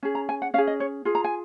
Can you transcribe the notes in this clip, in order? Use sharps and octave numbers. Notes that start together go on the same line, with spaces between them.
C#4 G#4
A#5
G#5
F#5
C#4 G#4 F5
D#5
C#5
F4 G#4
A#5
G#5